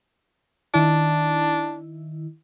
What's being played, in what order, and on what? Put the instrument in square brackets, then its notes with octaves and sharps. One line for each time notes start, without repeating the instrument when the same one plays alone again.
[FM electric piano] D#3 E4 [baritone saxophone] D4